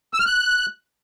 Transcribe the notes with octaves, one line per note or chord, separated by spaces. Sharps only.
E6
F6
F#6